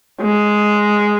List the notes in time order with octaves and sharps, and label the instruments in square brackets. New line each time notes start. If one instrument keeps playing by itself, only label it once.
[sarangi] G#3